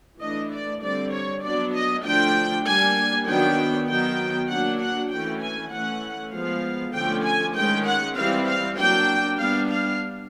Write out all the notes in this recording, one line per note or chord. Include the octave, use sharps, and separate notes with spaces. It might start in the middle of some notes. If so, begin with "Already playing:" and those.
E3 A3 D4 D#5
D5
D3 G3 C4 D5
C#5
F#3 B3 D4 D5
D#5
D3 F3 A3 D4 G5
G3 A#3 D4 G#5
D#3 F#3 B3 D4 G5
D#3 F#3 B3 G5
F#3 A#3 D4 F#5
F#5
E3 A3 C#4 G5
G#5
E3 A3 C#4 F#5
F3 G#3 B3 F5
D3 F3 A3 C#4 G5
G#5
D#3 G#3 C#4 G5
F#5
E3 G3 C4 F5
F5
F#3 A#3 D4 G5
G3 B3 D4 F5
F5